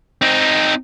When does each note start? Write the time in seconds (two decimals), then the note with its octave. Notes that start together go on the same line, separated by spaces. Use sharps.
0.22 C4 D#4